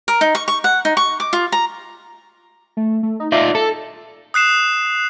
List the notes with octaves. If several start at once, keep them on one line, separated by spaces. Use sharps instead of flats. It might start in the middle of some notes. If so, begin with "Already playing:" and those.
A#4
D#4
C#6
C#6
F#5
D#4
C#6
D6
F4
A#5
A3
A3
D#4
D#4 F4 D5 E5
A4
D#6 F#6 C7 E7